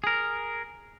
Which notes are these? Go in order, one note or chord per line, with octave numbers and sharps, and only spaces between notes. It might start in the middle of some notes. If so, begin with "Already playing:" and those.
G#4 A#4